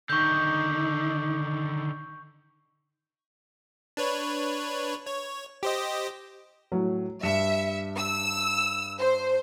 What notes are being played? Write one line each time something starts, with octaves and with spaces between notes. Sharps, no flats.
D3 D#3 D#4 C#6 G6
D4 B4 C#5
C#5
G4 C5 D#5
A2 F#3
G2 E5 C#7 E7
E6
C5